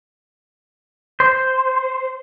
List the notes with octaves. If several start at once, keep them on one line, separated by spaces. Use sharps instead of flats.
C5